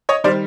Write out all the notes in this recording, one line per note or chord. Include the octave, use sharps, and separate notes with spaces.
C#5 D#5
D#3 G3 C5 D5